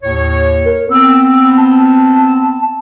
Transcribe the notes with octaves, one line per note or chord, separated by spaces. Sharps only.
D#2 A2 C#5
A#4
B3 C4 E6
A5